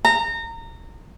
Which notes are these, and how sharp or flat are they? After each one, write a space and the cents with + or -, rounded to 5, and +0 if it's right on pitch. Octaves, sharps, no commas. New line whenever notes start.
A#5 -25